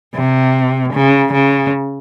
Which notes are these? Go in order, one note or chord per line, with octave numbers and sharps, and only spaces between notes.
C3
C#3
C#3